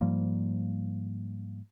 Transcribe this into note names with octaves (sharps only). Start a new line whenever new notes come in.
G#2 F3 G3 A#3